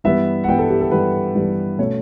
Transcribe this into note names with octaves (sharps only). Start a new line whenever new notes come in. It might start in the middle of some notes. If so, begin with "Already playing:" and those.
G2 E3 G3 B3 E5
F#5
G2 E3 G3 B3 G5
A4
G4
A4
G2 E3 G3 B3 B4
G2 E3 G3 B3
B2 A3 C#4 C#5